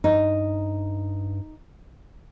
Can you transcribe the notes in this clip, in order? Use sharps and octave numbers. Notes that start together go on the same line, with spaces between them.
G2 D#4